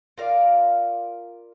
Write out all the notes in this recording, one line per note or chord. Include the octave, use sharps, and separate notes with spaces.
F4 A#4 D5 F5